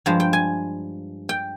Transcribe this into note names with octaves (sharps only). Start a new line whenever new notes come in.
G2 F3 G#3
G5
G#5
G5